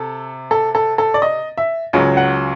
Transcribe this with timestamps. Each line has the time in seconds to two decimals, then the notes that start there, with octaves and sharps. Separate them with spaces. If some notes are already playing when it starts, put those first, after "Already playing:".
Already playing: C3 A4
0.51 A4
0.75 A4
0.98 A4
1.14 D5
1.22 D#5
1.58 E5
1.93 C#2 C#3 F#3
2.17 F#5